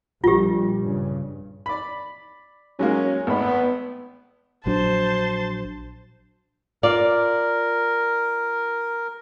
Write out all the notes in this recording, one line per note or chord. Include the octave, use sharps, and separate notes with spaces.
A#1 G3 F4 G4
G2 C#3
D5 B5
F#3 G#3 A#3 C#4
G#1 A3 B3 B5
A#1 F#3 D4 C5 A5
F4 A#4 D5